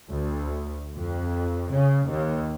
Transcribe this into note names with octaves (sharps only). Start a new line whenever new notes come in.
D2
F2
C#3
D#2